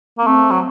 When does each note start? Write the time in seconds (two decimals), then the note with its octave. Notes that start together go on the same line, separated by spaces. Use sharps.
0.18 A#3 B3
0.26 A3 C4
0.51 F#3